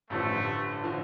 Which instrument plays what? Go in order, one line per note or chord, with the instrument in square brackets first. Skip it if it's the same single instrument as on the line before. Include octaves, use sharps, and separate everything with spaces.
[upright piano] A1 G2 D3 F3 [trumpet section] A3
[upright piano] D3 F3